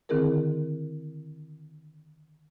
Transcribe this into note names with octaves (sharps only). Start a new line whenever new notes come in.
D3 D#3 C4 E4 G#4 A#4